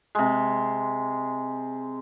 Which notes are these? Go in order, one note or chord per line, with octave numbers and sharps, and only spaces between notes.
C3 G#3